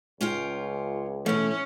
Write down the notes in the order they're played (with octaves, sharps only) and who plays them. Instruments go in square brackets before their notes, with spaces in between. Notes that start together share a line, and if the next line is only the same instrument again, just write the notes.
[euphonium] C#2 [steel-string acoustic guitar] C#4 F4 G5
[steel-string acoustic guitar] B2 E3 [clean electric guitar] A3 [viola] C#4